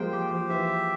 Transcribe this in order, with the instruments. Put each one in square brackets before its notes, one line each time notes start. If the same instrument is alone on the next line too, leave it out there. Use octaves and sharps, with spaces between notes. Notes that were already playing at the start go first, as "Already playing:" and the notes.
Already playing: [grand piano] F3 G3 G#3 A#3 [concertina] C5 G5
[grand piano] G3 [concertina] G4
[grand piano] F3
[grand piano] E3 [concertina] E5